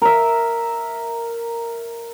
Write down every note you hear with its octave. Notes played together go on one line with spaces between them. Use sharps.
A#4 E5